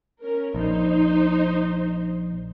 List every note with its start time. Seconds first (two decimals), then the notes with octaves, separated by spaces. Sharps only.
0.22 C#4 A#4
0.55 A#1 D#4 C5